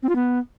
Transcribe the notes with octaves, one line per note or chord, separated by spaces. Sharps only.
C4
F4
B3